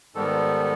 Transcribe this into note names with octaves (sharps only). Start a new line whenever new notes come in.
G#2 D#3 G3 B3 A4
A4